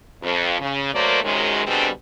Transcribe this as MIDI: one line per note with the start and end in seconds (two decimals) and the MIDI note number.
0.23 0.58 41
0.60 0.93 49
0.94 1.21 54
0.94 1.21 57
0.94 1.21 58
0.94 1.21 70
0.94 1.21 72
0.94 1.21 74
1.24 1.63 42
1.24 1.63 48
1.24 1.63 51
1.24 1.63 54
1.24 1.63 56
1.67 1.88 47
1.67 1.88 50
1.67 1.88 55
1.67 1.88 60
1.67 1.88 62
1.67 1.88 68